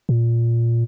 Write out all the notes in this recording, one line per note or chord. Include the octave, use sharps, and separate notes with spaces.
A#2